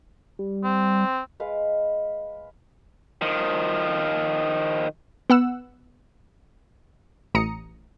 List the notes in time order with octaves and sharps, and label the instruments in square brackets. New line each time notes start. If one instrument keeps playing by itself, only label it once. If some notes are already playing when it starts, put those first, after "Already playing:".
[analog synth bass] G3
[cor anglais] C4
[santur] G#3 B4 F5
[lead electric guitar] D#3 F3
[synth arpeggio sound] B3 F#5 E6
A1 A#5 D#6 C#7